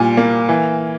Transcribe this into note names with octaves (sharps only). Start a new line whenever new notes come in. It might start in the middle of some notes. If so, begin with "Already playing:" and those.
Already playing: A#2 G3 G#5
A#3
E3